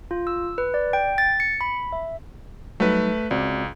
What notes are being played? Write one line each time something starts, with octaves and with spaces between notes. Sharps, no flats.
F4
E6
B4
D5
G5
A6
C#7
B5
E5
F#3 G3 A3 D#4 B4
C#2 C4 F#4 D5